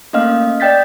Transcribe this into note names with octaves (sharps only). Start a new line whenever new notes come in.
A3 A#3 C#4 D#5 F5 F6
D5 D#5 G5 G6 A6 B6